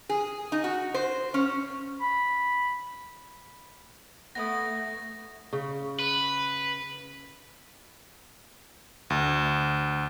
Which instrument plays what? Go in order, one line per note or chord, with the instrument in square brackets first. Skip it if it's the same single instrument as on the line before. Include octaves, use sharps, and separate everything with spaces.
[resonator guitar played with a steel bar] G#4
D#4
F#4
C5
C#4
[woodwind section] B5
[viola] A3 [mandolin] B3 E4 D#6 [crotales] A#6
[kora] C#3
[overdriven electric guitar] B4
[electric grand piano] D2